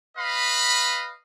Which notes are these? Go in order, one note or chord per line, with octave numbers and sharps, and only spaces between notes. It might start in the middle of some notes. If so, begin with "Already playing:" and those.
B4 D#5 F5 B5